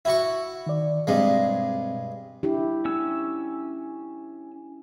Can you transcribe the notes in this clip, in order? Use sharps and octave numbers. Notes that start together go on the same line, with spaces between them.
E4 F#4 C#6
D#3 D5
G2 B2 G#3 C4
D4 E4 G4
C#4 E6